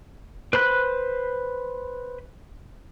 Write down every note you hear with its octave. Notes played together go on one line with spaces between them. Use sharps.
B4 C5 B5 F#6